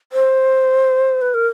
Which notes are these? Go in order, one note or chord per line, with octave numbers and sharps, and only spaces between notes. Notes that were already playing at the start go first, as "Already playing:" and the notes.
C5
B4
A#4